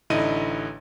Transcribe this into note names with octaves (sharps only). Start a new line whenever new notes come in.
A1 D3 D#4 E4 D#5 D#7